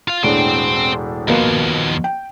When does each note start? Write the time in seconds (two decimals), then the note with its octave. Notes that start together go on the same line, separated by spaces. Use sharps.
0.08 F4 F5
0.23 E1 A2 D4 C5 G5
1.28 D#2 B2 F3 A#3 B3
2.04 G5